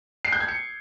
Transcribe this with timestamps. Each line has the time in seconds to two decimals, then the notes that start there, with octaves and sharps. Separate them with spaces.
0.25 C7
0.32 G6
0.40 G#6
0.48 C#7